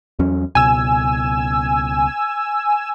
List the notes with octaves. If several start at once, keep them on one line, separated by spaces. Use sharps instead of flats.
E2 F#3 C#4
C#2 B2 G#5 E6